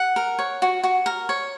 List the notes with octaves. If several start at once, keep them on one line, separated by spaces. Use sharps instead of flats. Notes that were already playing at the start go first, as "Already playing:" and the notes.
Already playing: F#5
A#4
C#5
F#4
F#4
A#4
C#5